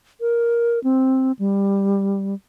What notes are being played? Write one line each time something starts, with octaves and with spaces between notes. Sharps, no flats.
A#4
C4
G3